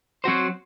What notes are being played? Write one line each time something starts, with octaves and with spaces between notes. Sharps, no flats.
F#3 C4 F#4 C5